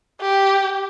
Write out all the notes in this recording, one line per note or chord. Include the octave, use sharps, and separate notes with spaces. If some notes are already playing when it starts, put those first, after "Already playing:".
G4